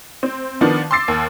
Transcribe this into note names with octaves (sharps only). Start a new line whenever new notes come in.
C4
D#3 F3 B3 D4
C6 D6 E6 A6 C7
D#2